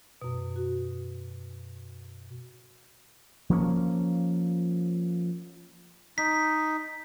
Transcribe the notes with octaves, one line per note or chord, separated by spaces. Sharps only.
F#2 B2
F#4
F3 A#3 C#4
D#4 B6